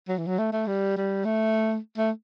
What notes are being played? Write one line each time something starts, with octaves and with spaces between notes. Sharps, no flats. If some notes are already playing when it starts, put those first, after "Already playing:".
F#3
E3
F#3
A3
A3
G3
G3
A3
A3